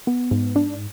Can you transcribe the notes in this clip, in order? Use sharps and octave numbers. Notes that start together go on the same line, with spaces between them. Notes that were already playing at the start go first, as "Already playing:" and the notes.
B3
G#2
D4